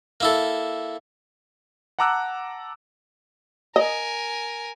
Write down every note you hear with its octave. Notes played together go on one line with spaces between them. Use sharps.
A#3 E4 A4
F#5 A5 A#5 D6 E6 F#6
A#4 D#5 G#5